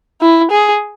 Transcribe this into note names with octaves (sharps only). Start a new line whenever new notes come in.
E4
G#4